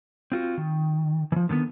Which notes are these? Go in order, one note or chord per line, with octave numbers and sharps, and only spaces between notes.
C4 F4 F#4
D#3
E3 F3
D3 D#3 G#3 B3